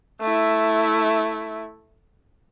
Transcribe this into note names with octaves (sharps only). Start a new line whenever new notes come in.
A3 E4